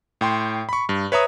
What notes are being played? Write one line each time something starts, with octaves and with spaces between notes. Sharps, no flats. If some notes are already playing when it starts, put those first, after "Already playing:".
A2 G5 C6
B5 C#6
G2
B4 C#5 E5 A#5 D#6